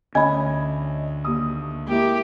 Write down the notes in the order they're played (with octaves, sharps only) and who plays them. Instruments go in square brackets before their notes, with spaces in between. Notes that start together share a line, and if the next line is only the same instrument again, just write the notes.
[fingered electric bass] D2 [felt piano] C#4 D#5 G#6 [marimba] G#5 B5
[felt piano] D#2 D#6
[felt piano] G#3 A#3 E4 [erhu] G4